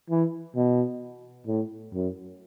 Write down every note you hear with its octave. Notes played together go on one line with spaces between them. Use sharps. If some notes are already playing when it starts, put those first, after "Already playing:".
E3
B2
A2
F#2